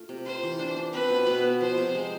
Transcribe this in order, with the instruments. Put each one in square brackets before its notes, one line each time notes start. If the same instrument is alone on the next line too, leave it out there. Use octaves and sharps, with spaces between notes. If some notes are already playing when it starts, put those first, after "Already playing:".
Already playing: [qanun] A3 F4
C3
[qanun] F4 [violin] C5
[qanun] E3
D4
D4
[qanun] C4 [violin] B4
[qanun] B2
B2
B3
[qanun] F3 [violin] C5
[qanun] C3
G#3